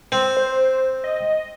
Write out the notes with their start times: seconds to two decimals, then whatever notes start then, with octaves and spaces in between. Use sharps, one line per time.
0.12 C4
0.37 C5
1.04 D#5